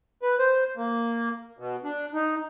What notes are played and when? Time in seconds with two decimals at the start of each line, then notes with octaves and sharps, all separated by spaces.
0.23 B4
0.39 C5
0.77 A#3
1.59 B2
1.84 D4
2.13 D#4